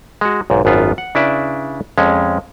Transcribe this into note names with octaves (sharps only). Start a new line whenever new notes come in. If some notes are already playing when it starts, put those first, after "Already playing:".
G#3 F#4
B1 G#2
G#1 F#2 B3 F4
F#5
C#3 D4 E4 B4 D5 E5
F2 G#3 C#4